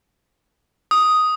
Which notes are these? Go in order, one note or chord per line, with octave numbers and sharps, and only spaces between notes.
D#6